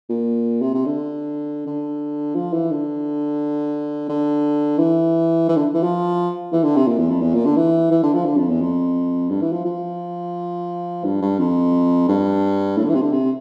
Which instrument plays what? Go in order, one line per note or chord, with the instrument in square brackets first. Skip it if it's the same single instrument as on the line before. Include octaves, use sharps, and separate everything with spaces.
[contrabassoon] A#2
C3
C3
D3
D3
F3
E3
D3
D3
E3
E3
D3
E3
F3
E3
D3
C3
A#2
E2
F2
E2
A#2
D3
E3
E3
D3
F3
D3
F2
E2
F2
G2
E3
F3
F3
G2
G2
F2
G2
A2
D3
E3
C3
D3
C3